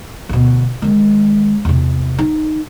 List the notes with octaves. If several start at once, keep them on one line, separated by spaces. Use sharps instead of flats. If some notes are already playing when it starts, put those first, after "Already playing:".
D2 B2
D#3 G#3
E2 C3
D#4